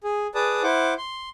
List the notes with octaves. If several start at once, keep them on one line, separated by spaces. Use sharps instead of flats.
G#4
G#4 B4 D5 A5 D#6
E4 C5 F#5 D6
C6